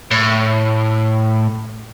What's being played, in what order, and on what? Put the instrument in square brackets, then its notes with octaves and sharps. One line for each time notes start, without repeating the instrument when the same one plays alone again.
[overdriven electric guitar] A2